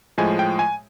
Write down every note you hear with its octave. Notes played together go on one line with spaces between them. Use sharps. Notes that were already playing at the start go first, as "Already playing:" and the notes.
A2 F3 G#3 G#5
G5
G#5